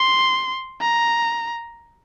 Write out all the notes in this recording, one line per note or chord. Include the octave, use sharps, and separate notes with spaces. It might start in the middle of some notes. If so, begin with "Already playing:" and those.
Already playing: C6
A#5